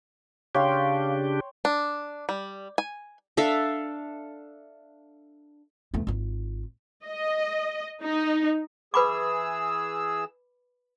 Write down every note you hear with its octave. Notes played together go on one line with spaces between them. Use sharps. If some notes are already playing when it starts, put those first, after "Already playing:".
C#3 D4 G4 C#5 F5 G5 C6
D4
G3
G#5
D4 A4 E5 F5
E2 A3
G#1 F4
D#5
D#4
E3 G#4 B4 B5 D6 E6